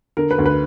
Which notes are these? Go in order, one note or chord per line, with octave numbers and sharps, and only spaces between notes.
D3 A#4
B4
D2
B4